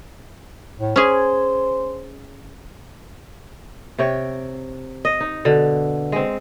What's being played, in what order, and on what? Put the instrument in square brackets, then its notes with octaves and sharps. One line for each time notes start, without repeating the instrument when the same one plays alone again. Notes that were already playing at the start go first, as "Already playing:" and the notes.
[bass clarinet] A2
[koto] C#4 G#4 [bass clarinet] C5
[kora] C3 C#5 G5
D#5
D#4
B2 D3
G#3 C4